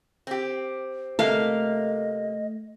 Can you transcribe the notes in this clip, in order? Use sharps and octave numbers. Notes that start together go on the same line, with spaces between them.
C4 G4
C3 A3 A#3 D#5 F5